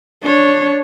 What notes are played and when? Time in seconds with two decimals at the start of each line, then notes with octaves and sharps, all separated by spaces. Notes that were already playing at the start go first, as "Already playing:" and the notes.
0.22 D4 C#5